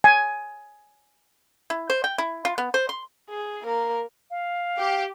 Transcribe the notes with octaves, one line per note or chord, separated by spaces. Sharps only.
G#5
E4
C5
G5
E4
F4
B3
C5
C6
G#4
A#3 A#4
F5
G4